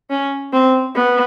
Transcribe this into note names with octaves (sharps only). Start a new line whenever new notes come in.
C#4
C4
B3